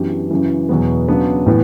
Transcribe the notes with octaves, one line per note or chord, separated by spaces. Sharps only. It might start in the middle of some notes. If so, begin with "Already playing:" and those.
Already playing: F#2 E3 B3 D4 G4
F#2 C#3 E3
E2 B2 F#3 B3
C#3 F#3 B3 D4
A2 E3 B3